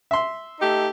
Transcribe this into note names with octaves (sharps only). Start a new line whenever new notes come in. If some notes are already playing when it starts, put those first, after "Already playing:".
E5 C6
A3 D#4 G4